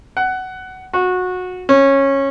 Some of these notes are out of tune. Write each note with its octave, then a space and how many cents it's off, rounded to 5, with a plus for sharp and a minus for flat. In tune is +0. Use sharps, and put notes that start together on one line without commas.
F#5 +15
F#4 -20
C#4 -15